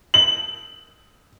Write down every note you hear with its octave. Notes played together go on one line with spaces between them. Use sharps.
F#7